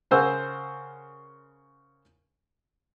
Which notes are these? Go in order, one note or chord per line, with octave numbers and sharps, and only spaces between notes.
C#3 A#4 C5 F#5 G#5 E6